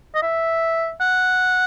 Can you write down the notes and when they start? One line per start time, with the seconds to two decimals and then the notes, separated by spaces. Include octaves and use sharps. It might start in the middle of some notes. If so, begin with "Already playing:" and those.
0.15 D#5
0.22 E5
1.01 F#5